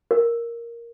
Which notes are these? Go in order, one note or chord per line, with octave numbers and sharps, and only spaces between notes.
A#4